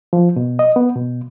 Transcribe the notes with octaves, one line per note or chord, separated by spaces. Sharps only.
F3
B2
D#5
B3
B2